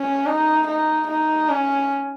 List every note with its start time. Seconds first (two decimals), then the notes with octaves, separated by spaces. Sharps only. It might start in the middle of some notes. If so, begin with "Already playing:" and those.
Already playing: C#4
0.26 D#4
0.67 D#4
1.08 D#4
1.49 C#4